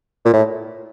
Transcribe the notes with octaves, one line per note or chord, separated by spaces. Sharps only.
A#2
A2